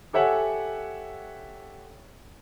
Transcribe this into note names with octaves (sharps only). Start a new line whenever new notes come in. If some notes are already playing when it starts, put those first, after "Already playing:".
G4 A4 C#5 E5 F#5 G#5